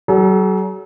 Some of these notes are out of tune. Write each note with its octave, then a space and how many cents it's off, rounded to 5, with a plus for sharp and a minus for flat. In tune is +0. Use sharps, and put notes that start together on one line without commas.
F#3 +40 A4 -45